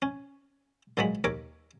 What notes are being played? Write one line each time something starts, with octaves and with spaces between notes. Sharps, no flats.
C#4
A#1 A#2 F#3 G#3 B5
D#2 A#4 C#5 D6